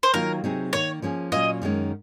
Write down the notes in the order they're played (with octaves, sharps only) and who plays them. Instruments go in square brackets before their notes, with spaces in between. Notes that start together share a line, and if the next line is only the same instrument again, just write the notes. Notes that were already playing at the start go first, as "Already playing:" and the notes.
[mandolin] C5
[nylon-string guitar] D#3 F#3 A#3 F4 [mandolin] A#4
[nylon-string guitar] C3 F#3 C4 D#4 G#4
[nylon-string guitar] D#3 A#3 D#4 [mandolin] C#5
[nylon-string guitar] F3 A#3 C#4 G#4
[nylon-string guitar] A#2 F#3 C#4 F4 [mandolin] D#5
[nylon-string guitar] F#2 D#3 G#3 C#4